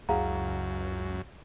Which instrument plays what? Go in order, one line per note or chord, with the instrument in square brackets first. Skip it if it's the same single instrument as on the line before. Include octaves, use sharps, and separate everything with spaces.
[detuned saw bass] C#2 [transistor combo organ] F#2 [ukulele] E4 G#4 F#5 [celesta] F5 A#5